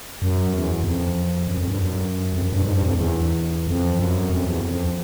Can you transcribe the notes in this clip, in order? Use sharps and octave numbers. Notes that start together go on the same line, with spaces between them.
F#2
E2
F2
F#2
F2
G2
F#2
F2
F#2
G2
G#2
G2
F2
E2
F2
F#2
F2
E2
F2